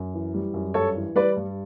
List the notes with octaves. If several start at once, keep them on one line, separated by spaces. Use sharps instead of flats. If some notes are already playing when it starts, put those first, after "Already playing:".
Already playing: F#2
E3
G3
F#2
G2 A4 C#5
E3
G3 B4 D5
G2